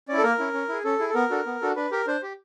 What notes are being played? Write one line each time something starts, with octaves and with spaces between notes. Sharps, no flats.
C#4 E4 D5
A4
A#3 A#4
C#4 E4
C#4
E4 G#4
C#4 A4
E4 G#4
A4
B3 A#4
D4 F#4 A4
B3
D4 F#4 A4
D4 B4
G4 A#4
D4 C5
G4